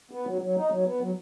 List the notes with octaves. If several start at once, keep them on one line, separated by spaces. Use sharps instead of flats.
B3
F#3
F#3
D#4
F#3
B3
F#3